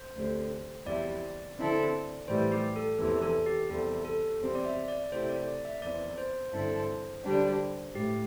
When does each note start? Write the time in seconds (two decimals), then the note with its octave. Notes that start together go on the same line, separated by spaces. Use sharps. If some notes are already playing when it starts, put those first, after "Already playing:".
Already playing: C5
0.15 D2 D3 A3 C4 G4
0.86 E2 C3 G3 E4 D5
1.57 D3 C4 E4 A4
2.28 A2 E3 G3 C5
2.52 G4
2.76 A4
2.99 E2 C3 E3 A4
3.22 A4
3.46 G4
3.70 E2 C3 G3 A4
4.05 A4
4.40 E2 C3 G3 C4
4.55 D5
4.65 E5
4.88 D5
5.11 C3 A3 E4 G4 C5
5.29 D5
5.47 D5
5.65 E5
5.82 E2 E3 C4 D5
6.18 C5
6.53 G2 D3 C4 E4 A4
7.25 D3 G3 D4 G4
7.95 A2 G4